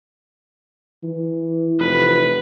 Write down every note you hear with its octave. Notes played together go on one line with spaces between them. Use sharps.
E3
F1 B4